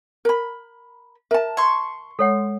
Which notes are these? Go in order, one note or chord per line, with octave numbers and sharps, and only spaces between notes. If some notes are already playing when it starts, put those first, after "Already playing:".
A#4 B5
A#4 E5 A5
C6 C#6 G#6
G#3 A4 C#5 F#5